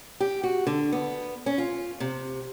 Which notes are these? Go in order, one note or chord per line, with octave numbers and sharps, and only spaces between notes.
G4
F#4
D3
B3
C#4
F4
C3